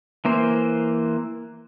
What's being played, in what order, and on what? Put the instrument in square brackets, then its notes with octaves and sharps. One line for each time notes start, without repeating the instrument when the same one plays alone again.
[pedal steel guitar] E3 A#3 C5